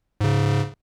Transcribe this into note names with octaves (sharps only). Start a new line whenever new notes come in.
G#2 C#3